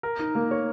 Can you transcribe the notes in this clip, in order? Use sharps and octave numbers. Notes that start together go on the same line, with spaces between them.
A#4
D#4
A#3
C#5